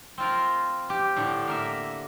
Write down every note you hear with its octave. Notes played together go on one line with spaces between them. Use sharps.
C4 F4 A#4
G4
A2 D3
A#3 A#4 E5